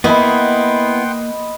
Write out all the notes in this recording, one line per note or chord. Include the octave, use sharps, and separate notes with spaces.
A#3 B3 E4 D#5 F#5 G5 B5 C6